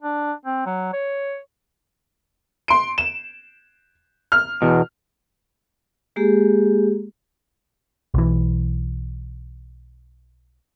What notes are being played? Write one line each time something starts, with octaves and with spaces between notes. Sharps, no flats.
D4
C4
F#3
C#5
C6 D7
E7
F6
E2 B2
G#3 A#3 G4 G#4
B1 E3